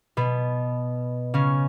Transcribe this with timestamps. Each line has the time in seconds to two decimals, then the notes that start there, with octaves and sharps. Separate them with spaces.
0.17 B2 B3
1.34 C#3 C#4